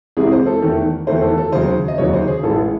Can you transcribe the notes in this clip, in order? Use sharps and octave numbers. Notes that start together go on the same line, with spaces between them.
C2 C3 E3 G#3 G#4
C5
A4
E2 D#3 A3
E2 D#3 A3 C5
A4
A4
D#2 C#3 F#3 C5
D#5
D#2 C#3 F#3 C#5
C5
G#4
A1 A2 G#3 A4